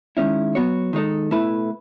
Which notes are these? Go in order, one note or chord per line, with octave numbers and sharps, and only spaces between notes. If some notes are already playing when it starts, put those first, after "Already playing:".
D#3 G#3 C#4 E4
F#3 B3 F#4 C#5
D#3 G#3 D#4 A4
B2 A3 E4 B4